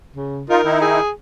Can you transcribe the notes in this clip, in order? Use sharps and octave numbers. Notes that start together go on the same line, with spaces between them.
C#3
D#4 F4 A#4
D#3 D#4 E4
G#4